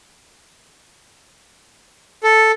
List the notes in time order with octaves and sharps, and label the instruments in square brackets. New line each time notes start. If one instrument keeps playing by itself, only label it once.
[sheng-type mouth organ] A4